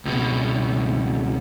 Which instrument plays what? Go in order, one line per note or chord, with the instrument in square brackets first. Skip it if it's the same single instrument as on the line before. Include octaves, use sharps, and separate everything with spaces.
[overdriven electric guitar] C#2 B2